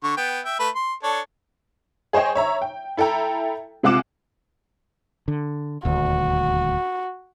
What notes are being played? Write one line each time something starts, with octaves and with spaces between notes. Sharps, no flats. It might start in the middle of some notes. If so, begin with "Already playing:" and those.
D3 C#6
B3 G5
E5 G5
A3 B4
C6
D4 A4 C#5
G#4 C5 C#5 D#5 G5
C#5 E5 A#5
G5
E4 A4 E5 G5 A#5
C3 G#3 F4 F#5 D6 E7
D3
D#1 D2 F#4